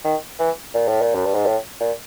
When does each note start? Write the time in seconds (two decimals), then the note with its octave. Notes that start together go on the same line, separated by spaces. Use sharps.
0.04 D#3
0.39 E3
0.74 A#2
0.88 A2
1.02 A#2
1.15 F#2
1.25 G2
1.35 G#2
1.46 A2
1.80 A#2